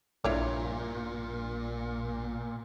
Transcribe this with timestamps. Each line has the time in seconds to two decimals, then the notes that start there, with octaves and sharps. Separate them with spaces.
0.24 A#1 G2 A#2 E4 C#5 D5